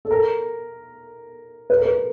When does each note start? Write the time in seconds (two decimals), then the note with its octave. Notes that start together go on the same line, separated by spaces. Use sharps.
0.05 A4
0.11 A#4
1.70 B4
1.77 A#4
1.85 B4